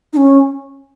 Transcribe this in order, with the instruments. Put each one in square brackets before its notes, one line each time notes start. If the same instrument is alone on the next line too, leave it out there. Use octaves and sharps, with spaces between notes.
[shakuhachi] D#4
C#4